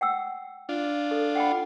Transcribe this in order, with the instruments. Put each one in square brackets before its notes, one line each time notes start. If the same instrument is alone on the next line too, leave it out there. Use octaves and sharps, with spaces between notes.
[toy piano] F#5 G5 E6
[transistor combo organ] D4 F4
[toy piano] A4
F#5 G5 B5